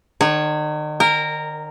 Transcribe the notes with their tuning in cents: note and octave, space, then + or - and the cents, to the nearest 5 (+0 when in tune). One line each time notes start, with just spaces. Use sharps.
D#3 -40 C#5 +0
A#4 -10 G5 +45